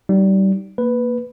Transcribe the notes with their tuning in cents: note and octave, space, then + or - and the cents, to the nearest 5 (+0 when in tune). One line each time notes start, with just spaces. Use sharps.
G3 -25 D#4 +0
A#3 +0 B4 +0